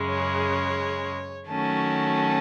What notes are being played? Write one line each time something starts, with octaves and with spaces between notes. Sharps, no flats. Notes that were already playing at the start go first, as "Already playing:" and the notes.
Already playing: F#2 C#3 G#3
C#5
D#3 F#3 A3 C#4 F#4 A5